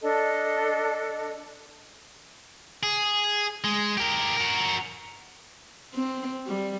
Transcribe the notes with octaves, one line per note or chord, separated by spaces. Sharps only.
D4 A4 D#5
G#4
G#3
G4 A#4
F#4 A#4
C4
G3